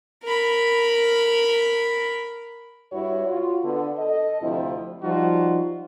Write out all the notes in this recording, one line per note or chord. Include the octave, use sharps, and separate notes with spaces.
A#4 B5
G2 G3 E4 F#4 C#5
F4 F#4
D3 B3
A4 D#5
D2 C3 F3 C4 E4
F3 G3 D#4 F4 F#4